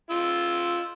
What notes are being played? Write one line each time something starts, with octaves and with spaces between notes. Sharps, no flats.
F4 E6